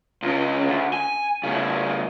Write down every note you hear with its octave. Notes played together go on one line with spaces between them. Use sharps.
C#2 C#3
D2
G#5
A2 C#3